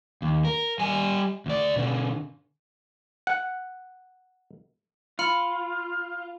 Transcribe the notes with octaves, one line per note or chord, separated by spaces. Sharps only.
D#2
A#4
G3 G#5
D2 D5
B2 D3
F#5
F4 B5 F6 C#7